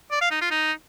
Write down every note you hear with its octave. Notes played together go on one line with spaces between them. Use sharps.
D5
F5
D#4
F4
D#4